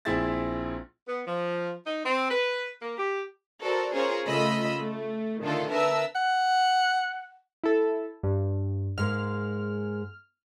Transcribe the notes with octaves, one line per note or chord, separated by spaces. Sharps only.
A#1 C4 E4 G#4 E5 A6
B3
F3
D#4
C4
B4
A#3
G4
F#4 A4 A#4 C5 D5
C#4 F4 G#4 A#4 C5 C#5
C#3 A3 F4 D#5 B5 E6
A3
D3 D#3 A3 D4 F4 A4
A#4 B4 E5 A5 E6
F#5
E4 A4
G2
G#2 G#3 A#3 F6